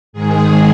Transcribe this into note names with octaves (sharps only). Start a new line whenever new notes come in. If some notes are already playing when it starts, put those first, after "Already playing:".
G#2 D#3 G#3 G#4